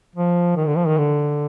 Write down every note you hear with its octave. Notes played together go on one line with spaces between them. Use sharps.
F3
D#3
D3
F3
D#3
D3